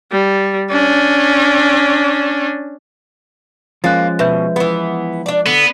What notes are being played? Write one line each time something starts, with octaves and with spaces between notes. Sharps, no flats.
G3
C#4 D4
F3 G#3 A#3 C#4 F#6 A6
B2 B4 E5 G6
E3 B3
D4 D5
D3 B3